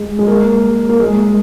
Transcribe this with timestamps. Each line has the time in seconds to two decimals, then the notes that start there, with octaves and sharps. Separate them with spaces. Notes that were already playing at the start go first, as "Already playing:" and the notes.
Already playing: G#3
0.19 G#3
0.27 A#3
0.89 A#3
1.00 G#3